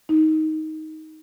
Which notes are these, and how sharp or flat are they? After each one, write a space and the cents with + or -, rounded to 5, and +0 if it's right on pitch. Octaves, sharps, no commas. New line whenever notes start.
D#4 +10